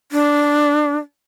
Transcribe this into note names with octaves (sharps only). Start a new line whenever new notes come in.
D4